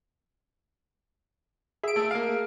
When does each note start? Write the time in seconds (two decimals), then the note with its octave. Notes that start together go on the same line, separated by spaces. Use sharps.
1.83 G#4 E5 D7
1.96 A3
2.11 A#3 F5